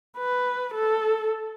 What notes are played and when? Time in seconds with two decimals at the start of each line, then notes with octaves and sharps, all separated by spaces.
0.18 B4
0.74 A4